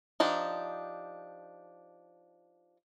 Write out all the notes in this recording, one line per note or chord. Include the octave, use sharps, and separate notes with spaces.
F3 D4 D#4 G4